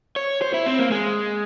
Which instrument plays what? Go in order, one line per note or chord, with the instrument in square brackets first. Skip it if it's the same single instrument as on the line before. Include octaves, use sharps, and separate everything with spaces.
[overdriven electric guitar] C#5
C5
E4
C4
A#3
G#3